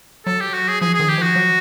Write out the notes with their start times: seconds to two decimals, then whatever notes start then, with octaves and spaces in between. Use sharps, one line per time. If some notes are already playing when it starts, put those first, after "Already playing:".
0.26 F#3 A4
0.40 G4
0.54 F#4
0.68 G#4
0.81 F3 G#4
0.94 G#4
1.00 D#3
1.08 G4
1.18 F3 F#4
1.36 F#3